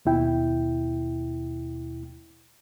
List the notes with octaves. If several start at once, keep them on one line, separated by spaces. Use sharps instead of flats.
D#2 B2 E4 G5